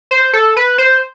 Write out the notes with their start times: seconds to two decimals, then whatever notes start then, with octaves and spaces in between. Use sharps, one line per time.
0.11 C5
0.33 A4
0.57 B4
0.78 C5